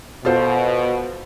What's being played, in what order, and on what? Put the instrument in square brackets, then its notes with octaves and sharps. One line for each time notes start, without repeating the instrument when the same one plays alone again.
[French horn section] B2 [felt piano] F4 A4 C5